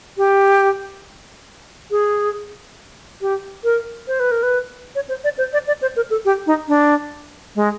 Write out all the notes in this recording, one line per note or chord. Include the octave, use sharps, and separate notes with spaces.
G4
G#4
G4
A#4
C5
B4
A#4
B4
C#5
C5
D5
C5
D5
D5
C5
A#4
A4
G4
D#4
D4
G#3